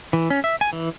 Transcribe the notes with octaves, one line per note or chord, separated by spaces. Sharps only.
E3
C#4
E5
G#5
E3